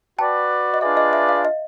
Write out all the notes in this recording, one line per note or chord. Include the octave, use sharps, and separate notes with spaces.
F#4 B4 D5 G5 A5
D#5
D4 F4 G#4 B4 D5 E5
D#5
E5
F5
D#5